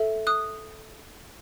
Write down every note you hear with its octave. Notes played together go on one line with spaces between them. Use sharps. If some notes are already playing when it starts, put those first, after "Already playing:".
Already playing: A4 E5
D#6 F#6